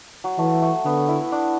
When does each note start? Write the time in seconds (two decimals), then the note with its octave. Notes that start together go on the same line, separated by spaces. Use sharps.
0.24 F#3
0.38 E3 A3
0.62 A3
0.85 D3 B3
1.08 E4
1.32 D4